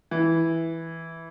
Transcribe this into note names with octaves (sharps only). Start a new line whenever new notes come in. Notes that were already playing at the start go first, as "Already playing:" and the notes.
E3